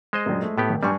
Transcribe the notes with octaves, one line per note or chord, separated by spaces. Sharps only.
G#3 C5 D#5
A#1 F#2
A3
A2 A3 B3 G4
D#1
G2 G3 G#5 C#6